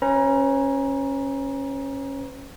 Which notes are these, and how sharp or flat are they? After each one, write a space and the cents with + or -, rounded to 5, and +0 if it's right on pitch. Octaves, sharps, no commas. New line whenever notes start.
C#4 -15 B4 +35 A#5 +25